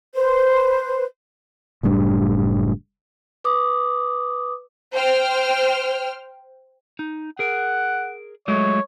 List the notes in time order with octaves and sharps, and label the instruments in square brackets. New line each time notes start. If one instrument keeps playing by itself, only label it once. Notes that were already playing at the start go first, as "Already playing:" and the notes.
[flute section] B4 C5
[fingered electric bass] F#1 A2 G3 D4
[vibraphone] B4 D6 D#6
[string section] C5 G5 F6
[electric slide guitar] D#4
[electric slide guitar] G#4 A#4 [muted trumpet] F#5
[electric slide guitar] F#3 G#3 A3 [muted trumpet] C#5